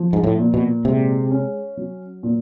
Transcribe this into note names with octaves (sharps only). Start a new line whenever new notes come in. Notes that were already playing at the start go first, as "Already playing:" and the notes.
Already playing: F3
G#2
A2
A#2
B2
C3 G#3
C#4
F#3
A#2